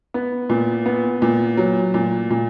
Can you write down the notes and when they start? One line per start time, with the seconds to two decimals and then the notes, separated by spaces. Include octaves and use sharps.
0.14 B3
0.50 A#2
0.86 B3
1.22 A#2
1.57 F#3
1.94 A#2
2.31 A#2